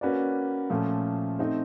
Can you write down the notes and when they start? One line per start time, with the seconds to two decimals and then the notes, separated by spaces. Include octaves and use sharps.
0.01 A#3 C#4 F#4 B4 D5
0.70 A#2 F3 A3 C#4
1.39 A3 C4 D#4